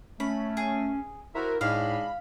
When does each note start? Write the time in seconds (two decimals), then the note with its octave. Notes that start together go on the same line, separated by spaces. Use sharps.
0.20 A3 C#4 B5
0.57 G#4
1.35 E4 F#4 A#4 C5 E5
1.61 A2 G#3 D4 D#4 F5 B5